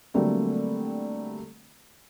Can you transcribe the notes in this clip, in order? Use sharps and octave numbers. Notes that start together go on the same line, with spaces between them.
D3 F#3 G3 A3 A#3 C4